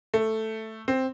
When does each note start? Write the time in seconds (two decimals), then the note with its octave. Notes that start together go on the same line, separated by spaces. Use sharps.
0.14 A3
0.88 C4